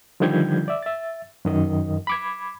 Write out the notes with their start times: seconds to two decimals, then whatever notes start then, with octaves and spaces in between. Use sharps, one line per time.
0.20 D3 D#3 F3 G3 G6 G#6
0.68 D5 E5
0.83 E5 A6
1.45 F#2 D#3 D#5
2.07 B5 D6 G#6